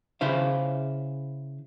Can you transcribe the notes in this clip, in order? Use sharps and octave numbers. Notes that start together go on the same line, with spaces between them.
C#3 E4 C5 F5